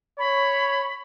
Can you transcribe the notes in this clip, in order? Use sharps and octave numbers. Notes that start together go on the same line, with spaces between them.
C#5 B5